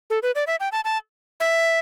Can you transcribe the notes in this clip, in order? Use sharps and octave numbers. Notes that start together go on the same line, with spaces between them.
A4
B4
D5
E5
G5
A5
A5
E5